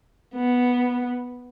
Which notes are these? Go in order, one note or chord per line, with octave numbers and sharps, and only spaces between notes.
B3